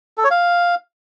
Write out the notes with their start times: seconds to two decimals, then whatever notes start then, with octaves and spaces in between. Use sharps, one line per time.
0.18 A4
0.24 C#5
0.31 F5